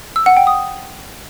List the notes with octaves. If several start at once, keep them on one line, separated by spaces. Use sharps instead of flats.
E6
F#5
G5
D#6